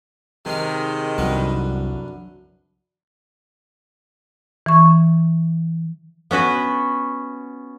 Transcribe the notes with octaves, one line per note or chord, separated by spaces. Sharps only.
C3 D#3 G#3 G#4 A#4
C2 F#2 D3 B4
E3 C#6
B3 C#4 F#4 B4